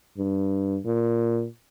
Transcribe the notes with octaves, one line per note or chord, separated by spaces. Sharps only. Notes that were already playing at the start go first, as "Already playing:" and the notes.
G2
A#2